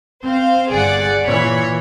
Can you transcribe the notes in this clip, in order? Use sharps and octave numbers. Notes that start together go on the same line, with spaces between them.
C4 C5 F5
G1 G#4 D5 F#5
A#2 E3 C#5 B5